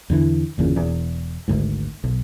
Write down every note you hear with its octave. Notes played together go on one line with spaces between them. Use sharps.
E2 D3 E3
G1 E2 A#2 C#3
E1 E2
G#1 D2 G#2
B1